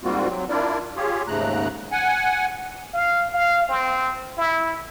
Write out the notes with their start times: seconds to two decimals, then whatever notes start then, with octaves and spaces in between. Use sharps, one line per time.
0.04 G#2 G3 A#3 C4 F4 F#4
0.29 F#3 C4
0.49 D4 E4 F4 A#4 D5
0.96 F4 G4 G#4 C#5
1.28 D#2 G#2 C#3 A3 A#5 F#6
1.92 F#5 G#5
2.94 F5
3.34 F5
3.69 C4
4.37 E4